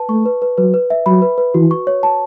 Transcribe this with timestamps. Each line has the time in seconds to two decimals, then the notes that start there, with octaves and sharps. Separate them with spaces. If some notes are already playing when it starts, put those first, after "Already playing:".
Already playing: B4 A5
0.09 A3 C#6
0.26 B4
0.42 B4
0.57 F#3 B4
0.74 B4
0.90 E5
1.06 F#3 B5
1.22 B4
1.38 B4
1.54 E3 F#4
1.71 C#6
1.87 C#5
2.03 A5